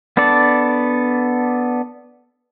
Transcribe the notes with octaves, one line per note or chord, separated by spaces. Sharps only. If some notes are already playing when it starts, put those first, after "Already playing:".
B3 D4 A4 D5